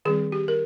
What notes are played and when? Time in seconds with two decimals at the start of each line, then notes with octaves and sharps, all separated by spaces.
0.05 D#3 G3 C4 G#4
0.32 G4
0.48 A#4